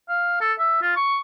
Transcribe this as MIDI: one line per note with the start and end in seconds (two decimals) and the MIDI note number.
0.09 0.36 77
0.41 0.53 69
0.59 0.78 76
0.82 0.94 65
0.96 1.19 85